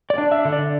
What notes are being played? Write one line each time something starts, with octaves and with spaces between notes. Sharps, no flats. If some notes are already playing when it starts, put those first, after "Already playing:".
D5
D4
E5
D3
D5